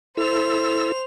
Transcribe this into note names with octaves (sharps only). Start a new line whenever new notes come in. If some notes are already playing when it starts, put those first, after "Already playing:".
E4 A4 C5 E6 F7